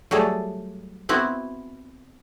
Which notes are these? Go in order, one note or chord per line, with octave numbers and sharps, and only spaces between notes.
F#3 G3 A3 G#4 A4
B3 C4 E4 F#4